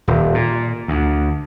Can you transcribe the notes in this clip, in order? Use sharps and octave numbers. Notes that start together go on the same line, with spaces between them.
D#1
A#2
D2